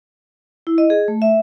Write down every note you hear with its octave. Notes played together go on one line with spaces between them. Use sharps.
E4
D#5
G#4
A3
E5